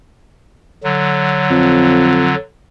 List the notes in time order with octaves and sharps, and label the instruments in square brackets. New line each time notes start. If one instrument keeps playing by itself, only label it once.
[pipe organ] D3 F#3
[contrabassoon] F2